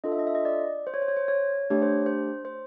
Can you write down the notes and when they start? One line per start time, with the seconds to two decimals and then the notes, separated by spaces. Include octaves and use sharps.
0.04 D4 F4 A4 D#5
0.12 E5
0.19 D#5
0.27 E5
0.35 D#5
0.45 D5
0.87 C5
0.94 C#5
1.02 C5
1.08 C#5
1.17 C5
1.28 C#5
1.70 A3 D4 G4 C#5
1.82 C5
2.06 C5
2.45 C5